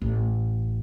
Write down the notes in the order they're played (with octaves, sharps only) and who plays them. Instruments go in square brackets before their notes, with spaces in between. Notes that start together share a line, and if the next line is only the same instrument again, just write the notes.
[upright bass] A1